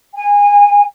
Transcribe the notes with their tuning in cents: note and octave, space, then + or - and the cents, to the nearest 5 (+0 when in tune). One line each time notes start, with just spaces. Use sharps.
G#5 -25